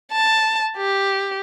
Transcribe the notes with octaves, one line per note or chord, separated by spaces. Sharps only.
A5
G4